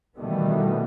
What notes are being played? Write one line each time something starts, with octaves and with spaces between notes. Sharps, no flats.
B2 D#3 E3 G3 A3 B3